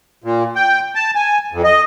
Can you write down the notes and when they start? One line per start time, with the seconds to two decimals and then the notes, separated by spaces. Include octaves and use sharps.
0.24 A#2
0.56 G5
0.95 A5
1.15 G#5
1.52 F2
1.64 D#5